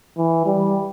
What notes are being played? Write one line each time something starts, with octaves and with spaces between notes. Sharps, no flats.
E3
G3